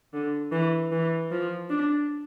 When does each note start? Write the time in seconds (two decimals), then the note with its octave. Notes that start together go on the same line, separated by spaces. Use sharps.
0.14 D3
0.52 E3
0.92 E3
1.31 F3
1.70 D4